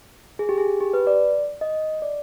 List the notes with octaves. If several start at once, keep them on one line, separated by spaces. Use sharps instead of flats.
G#4
G4
G#4
G4
B4
D5
D#5
D5